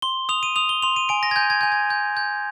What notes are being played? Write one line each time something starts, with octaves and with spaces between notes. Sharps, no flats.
C6 G7
D#6 F7
D#7
D#6 F7
G7
C6 F7
D#7
G#5 D7
A#6
G#6
G#5 G6
G#6
G#5 G6
G#6
G6
G6